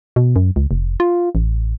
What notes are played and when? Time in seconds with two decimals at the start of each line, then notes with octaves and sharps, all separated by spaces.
0.16 B2
0.36 F#2
0.56 C#2
0.71 F1
1.00 F4
1.35 A1